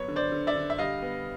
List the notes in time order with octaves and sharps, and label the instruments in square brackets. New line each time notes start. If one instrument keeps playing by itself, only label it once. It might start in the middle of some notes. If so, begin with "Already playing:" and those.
Already playing: [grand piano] F#3 B3 C#5
D3
C5 D5
D3
D5 E5
D3
E5
G3 D#5 F5
B3